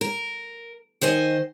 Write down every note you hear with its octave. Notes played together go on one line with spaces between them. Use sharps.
A#4
D#3 C5 D#5 G#5